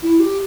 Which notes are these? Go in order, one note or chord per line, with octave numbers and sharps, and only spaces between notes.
E4
G4